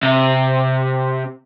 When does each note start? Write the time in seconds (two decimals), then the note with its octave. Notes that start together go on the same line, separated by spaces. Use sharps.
0.03 C3 E5